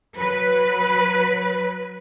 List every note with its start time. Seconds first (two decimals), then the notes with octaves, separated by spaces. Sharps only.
0.15 F#3 B4